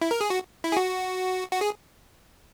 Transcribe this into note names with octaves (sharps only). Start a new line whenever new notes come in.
E4
A#4
G#4
F#4
E4
G#4
F#4
F#4
G#4